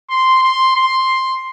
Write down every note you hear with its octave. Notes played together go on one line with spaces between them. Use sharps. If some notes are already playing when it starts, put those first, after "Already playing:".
C6
C6
C6